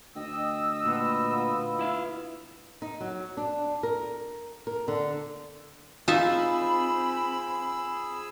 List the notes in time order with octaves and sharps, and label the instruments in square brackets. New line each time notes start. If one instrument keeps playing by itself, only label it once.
[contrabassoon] D2 [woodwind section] D#5 E6 [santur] G5
[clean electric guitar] A#2 [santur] D4 B4 F#5
[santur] B3 D#4 F4
[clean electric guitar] E4 E5 F5
[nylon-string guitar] D#4
F#3
D4
A#4
A#4
D3
[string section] C4 B5 [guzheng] D#4 E5 [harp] F4 [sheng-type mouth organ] G#4 E6